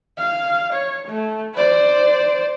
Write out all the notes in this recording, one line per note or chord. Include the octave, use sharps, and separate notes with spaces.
F5
C#5
A3
C5 D5